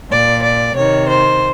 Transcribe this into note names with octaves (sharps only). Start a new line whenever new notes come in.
A#2 D5
D5
C3 D#3 C#5
C5